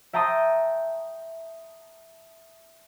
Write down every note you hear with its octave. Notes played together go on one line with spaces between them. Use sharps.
E5 G5 A5 A#5 C6 D#6